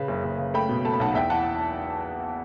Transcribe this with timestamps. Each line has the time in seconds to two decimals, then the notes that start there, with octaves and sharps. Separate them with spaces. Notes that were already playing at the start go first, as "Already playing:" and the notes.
Already playing: C#3 B4
0.08 F#1
0.24 F#1
0.39 C#3
0.54 A3 G5 B5
0.69 B2
0.85 A3 A5
0.93 B5
1.00 B1 F#5 A5
1.15 E2 E5 G5
1.30 E3 F#5 A5